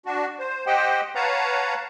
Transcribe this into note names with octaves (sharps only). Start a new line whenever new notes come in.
D4 F#4
C5
G4 C5 D#5 F#5 G5
B4 C#5 F5 F#5 A5 A#5